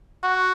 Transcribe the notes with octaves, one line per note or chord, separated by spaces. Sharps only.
F#4